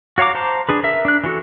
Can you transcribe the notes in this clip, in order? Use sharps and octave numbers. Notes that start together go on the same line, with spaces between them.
F#4 C#5 F5 A#5 D6
C5 A5 A#5
D4 G#4 B4
A#4 E5
D4 F#6
E3 F#4 A4